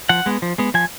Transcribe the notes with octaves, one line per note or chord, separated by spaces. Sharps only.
F3 F#5
G#3 B3
F3
G#3 B3
F3 G#5